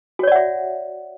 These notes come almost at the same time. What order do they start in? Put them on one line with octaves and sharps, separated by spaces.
F#4 C#5 D5 F#5 E5